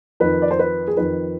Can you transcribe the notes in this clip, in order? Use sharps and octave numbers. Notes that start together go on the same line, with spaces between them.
F2 D#3 B4
D5
C5
B4
G#4
F2 D#3 B4